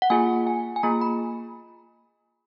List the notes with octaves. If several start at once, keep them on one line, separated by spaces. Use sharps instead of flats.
F#5
A#3 F4 G#4 G#5
G#5
G#5
A#3 F4 G#4 A#5
B5